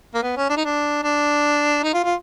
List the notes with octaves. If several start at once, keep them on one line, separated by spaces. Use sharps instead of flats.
A#3
B3
C#4
D4
D#4
D4
D4
D#4
F4
F4